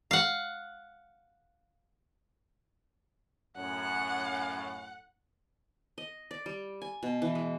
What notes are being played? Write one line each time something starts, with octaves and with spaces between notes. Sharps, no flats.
F5 F#5
F#2 A2 C#4 F#5
D#5
D5
G3
G#5
B2
E3
G#3